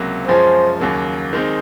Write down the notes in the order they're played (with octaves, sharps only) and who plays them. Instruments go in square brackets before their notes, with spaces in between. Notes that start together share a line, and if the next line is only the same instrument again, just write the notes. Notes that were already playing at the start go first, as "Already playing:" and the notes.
Already playing: [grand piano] C#2 C3 F#3 A#3
[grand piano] F#2 F3 G#3 C#4 [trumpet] C5
[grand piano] D#2 C#3 F#3 A#3
D#3 G#3 C4 D#4